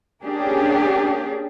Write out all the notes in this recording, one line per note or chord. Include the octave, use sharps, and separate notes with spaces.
A#3 C#4 D4 G4 G#4